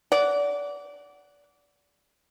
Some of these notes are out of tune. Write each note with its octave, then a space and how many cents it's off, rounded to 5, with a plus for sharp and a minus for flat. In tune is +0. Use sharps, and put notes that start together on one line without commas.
D5 -25 F#5 +0